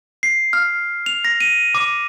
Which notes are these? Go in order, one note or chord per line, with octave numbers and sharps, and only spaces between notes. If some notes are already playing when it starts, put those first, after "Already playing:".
C7
F6
F7
A#6
D#7
D6